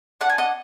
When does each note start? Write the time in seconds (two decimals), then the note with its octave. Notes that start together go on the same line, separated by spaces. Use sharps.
0.21 D4 F#5
0.29 G#5
0.38 D#5 F#5